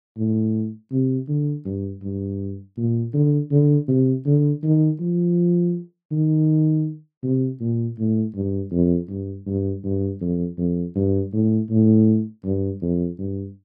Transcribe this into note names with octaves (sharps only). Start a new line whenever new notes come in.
A2
C3
D3
G2
G2
A#2
D3
D3
C3
D3
D#3
F3
D#3
C3
A#2
A2
G2
F2
G2
G2
G2
F2
F2
G2
A2
A2
G2
F2
G2